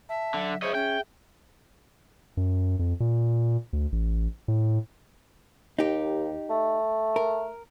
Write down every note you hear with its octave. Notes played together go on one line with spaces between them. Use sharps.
E5 A5
D3 F#3
G#4 C5 C#5 D#5 E5
C#4 G5
F#2
F2
A#2
D2
A1
A2
D#2 D#4 G4
A3
A#4